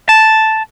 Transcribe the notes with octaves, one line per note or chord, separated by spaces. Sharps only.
A5